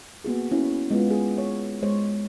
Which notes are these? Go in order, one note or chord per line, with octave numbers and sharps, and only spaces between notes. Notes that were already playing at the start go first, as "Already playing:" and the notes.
A#3 B3 F#4 G#4
C#4 E4 C#5
G#3 B3 F4
G#4
C#5
G#3 C5 C#5